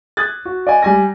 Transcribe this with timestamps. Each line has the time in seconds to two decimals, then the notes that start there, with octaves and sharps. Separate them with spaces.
0.17 D#6 F#6 G#6 A6
0.45 F#4
0.67 D5 D#5 G#5
0.83 G3 G#5 A#6